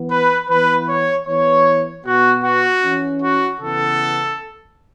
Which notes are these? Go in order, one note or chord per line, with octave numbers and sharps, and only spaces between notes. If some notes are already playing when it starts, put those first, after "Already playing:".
Already playing: E3 B3
B4
E3 B3 B4
C#5
E3 B3 C#5
B2 B3 F#4
F#4
E3 C#4
F#4
C#3 E3 B3 A4